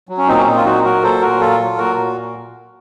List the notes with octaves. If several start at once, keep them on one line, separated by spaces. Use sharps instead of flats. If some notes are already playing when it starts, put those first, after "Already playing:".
F#3
C#4
A#2 C4 D#4
C#4
A#2 D#4
F4
F#3 D#4 F#4
F#3 F#4 A#4
A#2 A4 C5
A#2 F#4 A#4
F#3 F4 A4
F#3
A#2 F#4 A#4
A#2